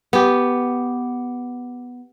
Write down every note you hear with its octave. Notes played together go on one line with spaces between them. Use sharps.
B3 G4